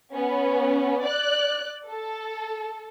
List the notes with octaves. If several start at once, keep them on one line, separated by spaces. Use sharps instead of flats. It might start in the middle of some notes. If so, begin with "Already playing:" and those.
B3 C#4
D5 F#6
A4